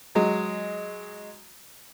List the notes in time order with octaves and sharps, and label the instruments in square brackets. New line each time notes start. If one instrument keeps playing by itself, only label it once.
[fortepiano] F#3 G#3